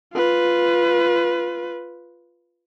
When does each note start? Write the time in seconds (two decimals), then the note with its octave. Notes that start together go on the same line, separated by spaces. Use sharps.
0.14 F4 B4